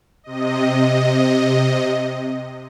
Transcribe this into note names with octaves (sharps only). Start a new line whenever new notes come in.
C3 D#5